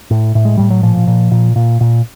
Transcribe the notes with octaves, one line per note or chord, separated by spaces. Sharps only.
A2
A2
G#3
A2 G3
F#3
A#2 F3
A#2
A#2
A#2
A#2